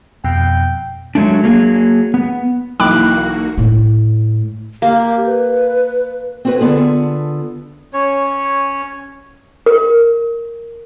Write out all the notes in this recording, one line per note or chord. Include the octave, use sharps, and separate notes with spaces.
F2 B2 G5
F#3 G#3 A3 D4
F#3 A#3 G#4
B3
B1 E3 A#3 F#4 G5 B5 D6 F#6
A2 A3
A#3 G4
B4
C4 F#4 B4
D3 B3 F4 G#4 A4
C#4 C#5
A#4